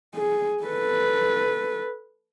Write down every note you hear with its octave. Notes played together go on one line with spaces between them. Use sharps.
G#4
A4 B4